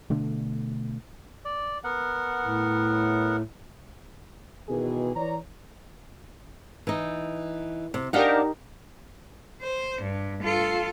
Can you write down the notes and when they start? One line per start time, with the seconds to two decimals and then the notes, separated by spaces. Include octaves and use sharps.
0.10 B2 D3 A3 D4
1.45 D5
1.84 B3 A#4 F#5
2.44 A2
4.69 B2 D#3 E3 G#4
5.16 E3 C#5 D5 A#5
6.87 E3 D#4
7.94 C3
8.13 D4 D#4 G4 A#4 F5 F#5
9.62 C5
10.02 G2
10.43 F4 A4